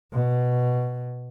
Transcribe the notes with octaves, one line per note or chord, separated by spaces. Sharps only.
B2